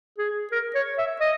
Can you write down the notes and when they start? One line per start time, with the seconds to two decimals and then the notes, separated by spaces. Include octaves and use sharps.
0.18 G#4
0.52 A#4
0.75 C#5
0.98 E5
1.20 D#5